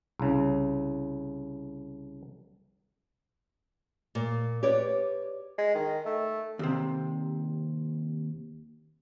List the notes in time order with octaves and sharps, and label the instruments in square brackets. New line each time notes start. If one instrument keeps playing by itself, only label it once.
[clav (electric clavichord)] C2 C#3
[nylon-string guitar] A#2
G4 B4 C#5 D5
[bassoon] G#3
D#3
A3
[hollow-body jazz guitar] D#2 C3